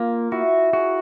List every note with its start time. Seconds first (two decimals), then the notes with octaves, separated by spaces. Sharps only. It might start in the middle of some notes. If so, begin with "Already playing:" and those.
Already playing: A#3 F4
0.32 E4 F#4
0.73 F#4 G#4